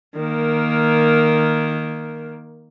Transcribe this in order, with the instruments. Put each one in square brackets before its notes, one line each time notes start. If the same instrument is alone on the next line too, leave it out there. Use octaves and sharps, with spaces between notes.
[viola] D#3 A#3